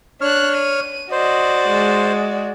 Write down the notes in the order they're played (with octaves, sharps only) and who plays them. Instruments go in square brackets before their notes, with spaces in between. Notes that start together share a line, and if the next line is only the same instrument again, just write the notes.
[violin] D4 F#6 [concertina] C#5 F6
[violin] D#7
[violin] F#4 D5 [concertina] C5 [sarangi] D#5
[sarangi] G#3